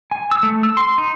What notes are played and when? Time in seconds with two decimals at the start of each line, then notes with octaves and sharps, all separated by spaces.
0.11 G#5
0.31 E6
0.43 A3
0.63 E6
0.77 C6
0.98 D#4